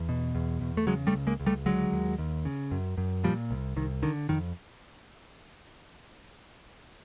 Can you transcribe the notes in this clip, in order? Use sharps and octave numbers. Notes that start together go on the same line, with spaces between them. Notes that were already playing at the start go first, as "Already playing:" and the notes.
Already playing: E2
B2
E2
E2
A3
C#3 F#3 G#3
G3 A3
C#2
G#3 A#3
C#2
G3 A3
D3 F#3 G#3
D#2
D#2
C#3
F#2
F#2
A#2 F3 G3
C2
C2 D#3
D3 D#3
F2 D#3